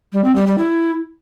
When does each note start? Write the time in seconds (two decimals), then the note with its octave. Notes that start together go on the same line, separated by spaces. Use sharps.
0.13 G3
0.24 C4
0.36 G3
0.47 G3
0.58 E4